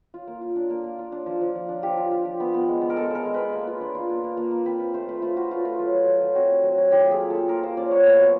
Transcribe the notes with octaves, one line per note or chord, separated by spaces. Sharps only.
F4
A#3
F4
D4
A#3
A#3
F4
D4
F3
F3
F3
D4
F3 G4
F4
F4
F3
B3
B3
G#3
B3
A#4
G#3 A4
G#3 A#4
G#3
B3 B4
A#3
F4
D4
F4
A#3
A#3
A#3
A#3
C4 B4
F4
A3 C5
A3 B4
A3 F4
F4 F#4
A3 F4
A3 F4
F#3
F#3
F#3
F#3
C4 F#4
A3
F#3
F#3
F4 G4
A#3
G#4
A#3
F4 A4
A#3 A#4
A#3 C5
C#4 D5
A#3 C#5
B3
F#3